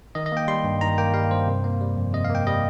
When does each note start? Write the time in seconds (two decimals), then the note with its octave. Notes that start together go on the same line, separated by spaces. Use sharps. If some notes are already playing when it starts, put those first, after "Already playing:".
0.15 D#3 D#5
0.26 D#5
0.32 A#3 G5
0.48 G3 C6
0.64 G2
0.81 D#3 A#5
0.98 A#3 G5
1.14 G3 F5
1.30 G2 C5
1.47 C3
1.64 A#3
1.81 G3
1.96 F2
2.13 C3 D#5
2.24 F5
2.30 A#3 G5
2.47 G3 D#5